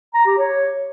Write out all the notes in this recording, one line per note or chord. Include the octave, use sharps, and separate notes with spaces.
A#5
G4
C#5